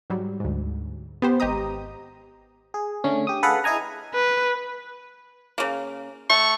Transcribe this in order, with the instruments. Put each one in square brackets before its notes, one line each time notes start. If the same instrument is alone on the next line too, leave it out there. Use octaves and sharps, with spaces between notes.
[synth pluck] G#2 F#3 G3
D2 G#2
B3 G4 C5
G#1 G4 D#5 A#5 D#6
[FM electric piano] G#4
D3 A3 C#4
G4 D#6
G#4 A4 B4 F5 F#5
E4 G#4 D#5 G#5 A#5
[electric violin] B4
[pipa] C#3 A#3
[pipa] A3 [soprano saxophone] C#6